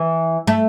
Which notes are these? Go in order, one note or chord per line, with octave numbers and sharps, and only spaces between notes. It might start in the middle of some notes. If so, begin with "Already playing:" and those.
Already playing: E3
A3